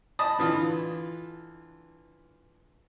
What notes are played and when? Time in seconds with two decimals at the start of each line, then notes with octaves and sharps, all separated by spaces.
0.19 D#5 A5 B5 D#6
0.39 D3 E3 F4